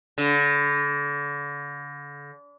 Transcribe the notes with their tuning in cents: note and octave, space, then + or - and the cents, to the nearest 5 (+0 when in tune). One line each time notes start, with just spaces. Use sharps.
D3 -35